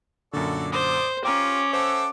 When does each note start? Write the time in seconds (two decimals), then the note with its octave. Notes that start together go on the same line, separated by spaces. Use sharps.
0.33 F#2 A#2 D3 F#4 A4 D5
0.72 C5 D5 D6 D#6
1.25 C#4 F4 G4 G5 A#5 D6
1.73 A4 C5 E5 F#5 D6